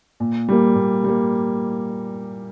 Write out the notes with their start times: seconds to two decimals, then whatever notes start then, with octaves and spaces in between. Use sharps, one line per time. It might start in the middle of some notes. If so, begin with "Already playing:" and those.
0.20 A#2
0.49 G3 A#3
0.75 A#2
1.04 G3 A#3